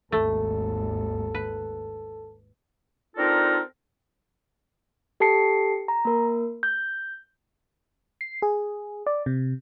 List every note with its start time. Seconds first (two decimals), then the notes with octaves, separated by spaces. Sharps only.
0.12 G#1 D#2 A3 A4
1.35 B4
3.17 C4 D4 D#4 F4 A4 A#4
5.20 G4 A4 A5 C7 C#7
5.88 A#5
6.05 A#3 A#4
6.63 G6
8.21 C7
8.42 G#4
9.07 D5
9.26 C3